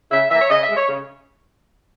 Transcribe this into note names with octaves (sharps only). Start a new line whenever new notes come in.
C#3 E5
E3 A#3 E5
C#5
C#3 D#5
E5
G#3
C#5
C#3